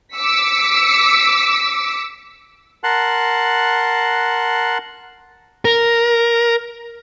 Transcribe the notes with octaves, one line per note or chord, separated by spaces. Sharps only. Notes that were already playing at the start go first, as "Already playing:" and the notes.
D6 E6 B6 C#7
A#4 F#5 A5 C6 F#6
A#4